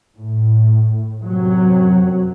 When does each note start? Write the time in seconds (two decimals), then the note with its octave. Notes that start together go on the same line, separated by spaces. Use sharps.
0.16 A2
1.25 F#2 C3 F#3